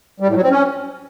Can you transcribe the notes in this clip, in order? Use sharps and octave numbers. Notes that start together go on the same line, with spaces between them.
G3
A2
F#3
C4
C#4